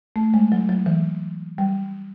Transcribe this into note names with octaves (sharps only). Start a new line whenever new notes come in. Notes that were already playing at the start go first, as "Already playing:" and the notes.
A3
G#3
F#3
F#3
E3
G3